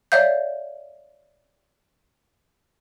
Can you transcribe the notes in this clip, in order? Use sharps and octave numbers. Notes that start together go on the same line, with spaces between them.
C#5 D5 E5 F5 G6